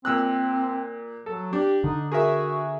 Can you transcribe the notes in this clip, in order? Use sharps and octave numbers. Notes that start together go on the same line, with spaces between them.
A#2 C4 E6 F#6
F#3 A4
D4 G4
D3 D#4
F#4 G#4 A#4 E5